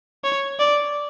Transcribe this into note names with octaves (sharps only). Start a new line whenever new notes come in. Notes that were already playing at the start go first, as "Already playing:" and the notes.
C#5
D5